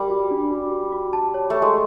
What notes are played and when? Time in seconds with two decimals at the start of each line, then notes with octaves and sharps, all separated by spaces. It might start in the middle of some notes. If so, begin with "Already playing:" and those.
Already playing: G3 A#4
0.10 F#4
0.31 D4
0.51 F#4
0.72 F#4
0.92 F#4
1.13 A5
1.34 C#5
1.50 A3 C#6
1.62 G#3